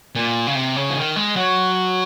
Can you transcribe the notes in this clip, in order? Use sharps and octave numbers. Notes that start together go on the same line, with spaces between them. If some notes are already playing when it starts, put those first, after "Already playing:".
A#2
C#3
C3
C#3
F3
D#3
G#3
F#3